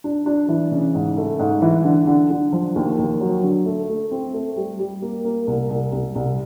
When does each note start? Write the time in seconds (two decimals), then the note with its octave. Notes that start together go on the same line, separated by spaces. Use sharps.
0.04 D4
0.26 D4
0.49 E3
0.71 C#3
0.95 G#2
1.18 A3
1.39 G#2
1.62 E3
1.84 D3
2.07 D3
2.30 D3
2.53 F3
2.76 D#2
2.98 D#2
3.20 F#3
3.44 D3
3.66 A3
3.89 A3
4.11 C4
4.34 A3
4.56 G3
4.79 G3
5.02 A#3
5.24 A#3
5.47 C2
5.70 C2
5.93 C2
6.15 C2